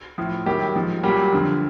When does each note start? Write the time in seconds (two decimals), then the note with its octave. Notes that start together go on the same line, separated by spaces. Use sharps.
0.18 A2 F3
0.46 F#2 D#3 F#3 G3 G4
0.75 G#2 F3
1.03 A#2 F#3 G3 G4
1.32 F2 D3 F3